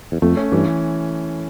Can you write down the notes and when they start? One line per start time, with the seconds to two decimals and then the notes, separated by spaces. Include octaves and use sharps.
0.12 E2
0.22 F2 A3
0.37 C#4
0.52 G2 E3